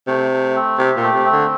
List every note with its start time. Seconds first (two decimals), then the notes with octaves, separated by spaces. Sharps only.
0.07 C3 A3
0.31 A3
0.55 C4
0.78 C3 G4
0.97 A#2
1.02 A3
1.14 C3
1.26 C4
1.32 D3